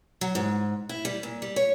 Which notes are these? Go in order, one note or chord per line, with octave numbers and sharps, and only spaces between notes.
F#3
G#2
E4
G3
A#2
G3
C#5